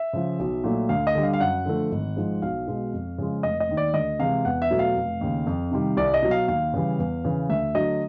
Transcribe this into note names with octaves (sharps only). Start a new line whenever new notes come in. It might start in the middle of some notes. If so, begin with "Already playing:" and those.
Already playing: E5
C#3 F3
B1
A#2 F#3 A3
D2 F5
D#5
D3 G3
F5
F5
F#2 F#5
D3 F3 A3
G#1
G#2 F3 G#3
B1 F5
B2 G#3
F2
C#3 F3 G#3
F1 D#5
D#5
D#2 D#3
D5
D2 D#5
C3 E3 G#3 F5
E2 F#5
E5
B2 F#3 A3
F5
F1
D#2 C#3
F2
C3 D#3 G3
C2 D5
D#5
B2 F#3
F5
D#2 F5
C#3 E3 G3
E2
C#3 E3
D2 E5
D3 F#3 A3 D#5